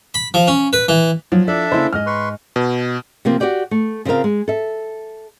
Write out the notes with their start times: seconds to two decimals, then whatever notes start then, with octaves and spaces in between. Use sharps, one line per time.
0.14 B5
0.34 F3
0.48 C#4
0.73 B4
0.88 E3
1.32 F3 F#3
1.47 D4 E4 A4 D5 E5
1.72 C#3 A#3 E4 C5
1.93 G#2 D#5 F6
2.06 B4 C6 C#6
2.56 B2
3.25 C3 F3 A#3 C4
3.40 F#4 G4 B4 D5 G5
3.71 A3
4.05 C#3 C4 F4 A#4 F5
4.24 G#3
4.48 A4 E5